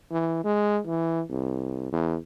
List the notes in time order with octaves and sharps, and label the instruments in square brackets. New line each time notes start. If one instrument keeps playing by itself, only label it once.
[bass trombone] E3
G#3
E3
C2
E2